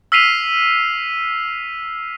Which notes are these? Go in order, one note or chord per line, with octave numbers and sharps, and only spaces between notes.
E6 F6 B6 C7 D#7 F7